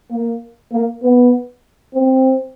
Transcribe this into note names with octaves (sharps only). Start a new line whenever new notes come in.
A#3
A#3
B3
C4